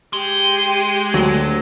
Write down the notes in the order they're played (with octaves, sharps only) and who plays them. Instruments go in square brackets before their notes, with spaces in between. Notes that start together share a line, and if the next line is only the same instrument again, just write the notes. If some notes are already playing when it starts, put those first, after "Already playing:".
[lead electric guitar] G#3 [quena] G4
[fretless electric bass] D2 [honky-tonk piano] F#3